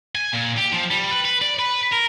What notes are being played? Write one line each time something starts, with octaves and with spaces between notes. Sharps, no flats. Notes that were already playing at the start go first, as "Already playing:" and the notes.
G#5
A#2
G4
F3
G3
B4
B4
D5
B4
A#4